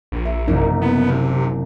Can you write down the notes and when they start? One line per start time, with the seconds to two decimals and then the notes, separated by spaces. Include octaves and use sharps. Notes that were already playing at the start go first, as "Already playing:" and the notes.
0.12 A#1
0.25 E5
0.47 F#1 C2 E3 D#4
0.82 B3
1.10 C3